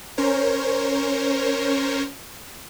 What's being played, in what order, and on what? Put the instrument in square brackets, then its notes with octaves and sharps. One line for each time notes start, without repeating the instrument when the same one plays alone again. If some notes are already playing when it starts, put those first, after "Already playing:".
[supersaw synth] C#4 A#4 C5 C#5